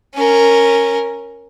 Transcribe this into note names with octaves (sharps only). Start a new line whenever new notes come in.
C#4 A#4